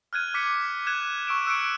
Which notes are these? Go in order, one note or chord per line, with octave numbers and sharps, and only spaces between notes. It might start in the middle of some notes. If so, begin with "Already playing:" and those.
F6 F#6 G#6 D#7
D6 B6 C#7
B6
D6 F#6 G#6 E7
C#6 E6 D7 E7
E6 F#6 C#7 D7